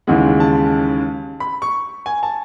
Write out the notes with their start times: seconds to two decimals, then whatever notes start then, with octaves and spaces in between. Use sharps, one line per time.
0.07 D#2 C#3 E3 G#3 F#5
0.40 A5
1.40 B5
1.62 C#6
2.06 G#5
2.23 A5